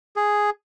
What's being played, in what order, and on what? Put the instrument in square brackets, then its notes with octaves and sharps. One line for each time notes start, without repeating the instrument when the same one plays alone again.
[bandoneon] G#4